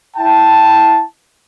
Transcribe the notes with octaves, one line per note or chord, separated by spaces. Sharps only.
E4 G5 A5